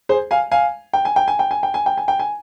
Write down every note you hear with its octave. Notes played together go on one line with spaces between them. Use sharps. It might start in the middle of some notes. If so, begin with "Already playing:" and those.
G#4 C5
F5 G#5
F5 G#5
G5
G#5
G5
G#5
G5
G#5
G5
G#5
G5
G#5
G5
G#5